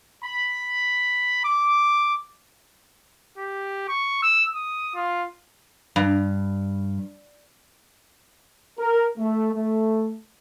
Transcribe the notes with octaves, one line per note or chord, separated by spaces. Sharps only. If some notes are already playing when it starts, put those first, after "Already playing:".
B5
D6
G4
C#6
E6
D#6
F4
G2
A#4
A3
A3